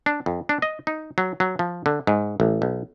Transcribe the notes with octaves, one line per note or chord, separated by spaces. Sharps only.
D4
F2
D4
D#5
D#4
F#3
F#3
F3
D3
G#2
A1
B1